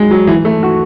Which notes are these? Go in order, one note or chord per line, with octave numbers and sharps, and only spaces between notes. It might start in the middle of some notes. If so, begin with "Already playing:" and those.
Already playing: F#3 G#3
F#3
E3
A3
F#4